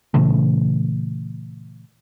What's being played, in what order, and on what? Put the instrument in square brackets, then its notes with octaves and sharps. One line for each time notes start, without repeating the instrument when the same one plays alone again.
[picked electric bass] A#2 C#3 E3 A3